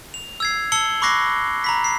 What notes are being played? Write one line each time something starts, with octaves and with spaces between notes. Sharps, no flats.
F7
E6 G#6 C7
A5 E6 C#7 F#7 G7
B5 C#6 D6 F#6 A#6 C7
A#5 B5 B6
C7